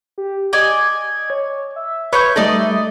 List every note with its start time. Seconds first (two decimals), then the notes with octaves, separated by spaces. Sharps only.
0.18 G4
0.53 D5 D#5 G#5 G#6
1.30 C#5
1.76 E5
2.13 B4 C#5 B5 C#6 G6
2.36 G3 A3 D#4 A4 D5 D#5